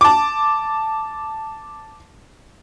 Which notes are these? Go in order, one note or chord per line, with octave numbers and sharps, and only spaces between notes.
A5 D6